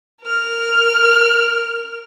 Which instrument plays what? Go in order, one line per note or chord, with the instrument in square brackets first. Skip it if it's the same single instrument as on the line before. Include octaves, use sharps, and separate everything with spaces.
[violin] A#4 F6